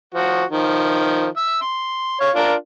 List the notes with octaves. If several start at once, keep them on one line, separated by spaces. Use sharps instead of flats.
F3 F#4
D#3 F3
E5 E6
C6
C#5 F5
D4 F4 A#4